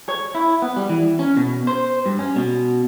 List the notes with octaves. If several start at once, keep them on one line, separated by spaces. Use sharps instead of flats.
C#5
E4
B3
G3
E3
C#4
B2
C5
G2
C#4
B2